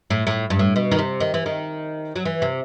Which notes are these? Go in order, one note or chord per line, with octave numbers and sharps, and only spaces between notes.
A2
A2
G2
A2
B2
D#3
C3
D#3
E3
D#3
F#3
E3
C3